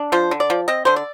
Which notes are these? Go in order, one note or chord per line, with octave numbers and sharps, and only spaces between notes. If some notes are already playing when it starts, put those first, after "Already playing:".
Already playing: D4
F3 C5
D3
D5
F3
C4 D#5
D3 C5
D5